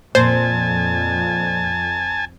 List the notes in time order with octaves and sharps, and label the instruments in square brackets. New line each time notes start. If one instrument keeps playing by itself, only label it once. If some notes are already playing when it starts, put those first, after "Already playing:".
[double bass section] F2 [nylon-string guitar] A#2 [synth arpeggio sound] C5 [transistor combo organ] G#5 A5